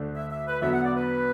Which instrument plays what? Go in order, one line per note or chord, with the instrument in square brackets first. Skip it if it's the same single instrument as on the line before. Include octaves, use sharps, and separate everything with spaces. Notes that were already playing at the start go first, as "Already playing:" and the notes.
Already playing: [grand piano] D2 D3 A3 D4
[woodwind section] E5
E5
B4
[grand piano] E2 D3 F#3 B3 [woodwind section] E5
[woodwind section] F#5
D5
B4